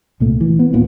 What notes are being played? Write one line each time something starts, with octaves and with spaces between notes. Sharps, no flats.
C2 A#2 A3
E3
B3
D1 D#2 A#2 B3